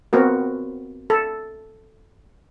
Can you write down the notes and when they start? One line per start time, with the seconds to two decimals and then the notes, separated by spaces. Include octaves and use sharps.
0.13 B3 C4 F#4 A#4
1.10 A4